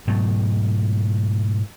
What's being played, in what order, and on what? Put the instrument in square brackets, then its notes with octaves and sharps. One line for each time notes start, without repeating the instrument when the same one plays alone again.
[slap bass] G#2 B2 F#3 A3